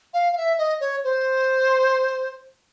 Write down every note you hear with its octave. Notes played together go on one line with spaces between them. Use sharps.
F5
F5
E5
D#5
C#5
C5